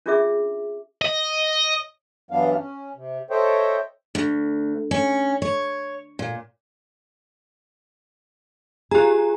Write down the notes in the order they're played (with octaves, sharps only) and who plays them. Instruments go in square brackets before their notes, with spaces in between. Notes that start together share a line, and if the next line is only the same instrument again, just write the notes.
[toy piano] C#4 D4 F4 G#4 E5 D6
[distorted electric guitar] D#5
[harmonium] G2 E3 F#3 B3 D4 F5
C#4
C3
A4 C5 C#5 D#5 E5 G5
[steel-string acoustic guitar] D2
C#4
C#5
A#2
[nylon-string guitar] F4 G#4 [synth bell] G4 A#5